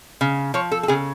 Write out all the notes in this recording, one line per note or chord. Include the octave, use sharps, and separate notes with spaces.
C#3
F3 C#5
A4
A4
C#3 G#4